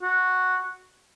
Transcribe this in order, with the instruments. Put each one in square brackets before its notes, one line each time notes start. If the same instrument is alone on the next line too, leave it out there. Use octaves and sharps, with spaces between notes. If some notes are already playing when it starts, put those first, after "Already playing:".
[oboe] F#4